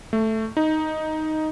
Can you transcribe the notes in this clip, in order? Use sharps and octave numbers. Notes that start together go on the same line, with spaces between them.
A3
D#4